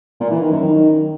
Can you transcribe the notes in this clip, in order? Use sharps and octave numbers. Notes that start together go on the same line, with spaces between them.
A#2
E3
D#3
F#2
D#3